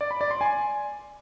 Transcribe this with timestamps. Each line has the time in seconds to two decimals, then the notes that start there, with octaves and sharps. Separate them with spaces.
0.01 D5
0.11 B5
0.21 D5
0.31 C6
0.41 G#5